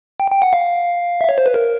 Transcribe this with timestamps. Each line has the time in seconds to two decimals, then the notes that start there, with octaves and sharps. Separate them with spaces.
0.20 G5
0.31 G5
0.42 F#5
0.53 F5
1.21 E5
1.29 C#5
1.38 C5
1.46 B4
1.54 A#4